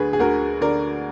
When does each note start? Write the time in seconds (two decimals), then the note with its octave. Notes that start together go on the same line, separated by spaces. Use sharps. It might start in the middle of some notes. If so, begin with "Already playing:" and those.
Already playing: D2 D3 G#4 B4
0.13 G#4
0.19 D2 F#4 A#4
0.61 D3 A#4 D5